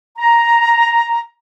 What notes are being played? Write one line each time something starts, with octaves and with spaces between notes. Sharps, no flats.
A#5